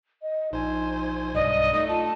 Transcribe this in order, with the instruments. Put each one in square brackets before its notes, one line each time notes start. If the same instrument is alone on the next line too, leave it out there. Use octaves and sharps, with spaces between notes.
[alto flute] D#5
[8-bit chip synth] A#1 C5 G#5 [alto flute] D#4
[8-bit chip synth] B1 G2 [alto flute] D5 [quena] D#5
[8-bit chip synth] A3 [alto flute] D#4 [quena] D#5
[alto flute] F4 [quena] A5